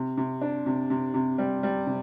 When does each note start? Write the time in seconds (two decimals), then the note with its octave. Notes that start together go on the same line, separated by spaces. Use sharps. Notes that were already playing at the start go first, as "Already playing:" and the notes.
Already playing: C3
0.18 C3
0.41 D4
0.66 C3
0.90 C3
1.14 C3
1.38 G3
1.63 G3
1.87 C3